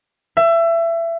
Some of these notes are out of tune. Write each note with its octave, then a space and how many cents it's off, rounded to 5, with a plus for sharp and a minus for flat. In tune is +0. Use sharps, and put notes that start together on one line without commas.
E5 +25